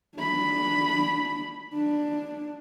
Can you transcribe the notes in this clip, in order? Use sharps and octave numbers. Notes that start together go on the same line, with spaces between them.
D4 B5
D4